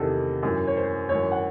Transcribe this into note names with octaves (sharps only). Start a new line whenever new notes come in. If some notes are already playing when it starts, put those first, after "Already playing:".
Already playing: E2 C3 D#3 A4
G#1 F#2 E3
C#5
C5
G#1 F#2 E3 C#5
F#5